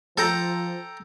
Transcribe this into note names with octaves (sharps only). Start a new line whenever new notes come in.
F3 A4 G5 A#5